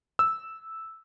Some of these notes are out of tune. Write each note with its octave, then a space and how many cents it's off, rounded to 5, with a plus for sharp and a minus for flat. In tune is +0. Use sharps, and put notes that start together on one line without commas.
E6 -5